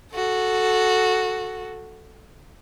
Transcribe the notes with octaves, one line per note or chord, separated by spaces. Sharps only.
F#4 A4